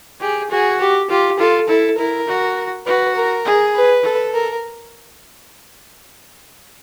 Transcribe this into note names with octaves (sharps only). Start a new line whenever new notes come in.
G4 G#4
F#4 G#4
G4
F4 G4
F4 A4
E4 A4
E4 A#4
F#4
F#4 B4
A#4
G#4
B4
A4
A#4